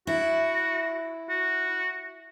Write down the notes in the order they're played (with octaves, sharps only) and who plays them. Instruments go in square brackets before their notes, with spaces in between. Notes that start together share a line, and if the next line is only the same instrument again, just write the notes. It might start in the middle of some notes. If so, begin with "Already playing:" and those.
[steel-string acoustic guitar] E4 [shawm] F#4
[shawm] F#4